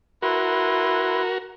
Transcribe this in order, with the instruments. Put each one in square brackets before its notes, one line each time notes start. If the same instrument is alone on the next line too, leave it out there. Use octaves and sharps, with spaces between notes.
[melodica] E4 B4 C6 [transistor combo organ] F#4 A#4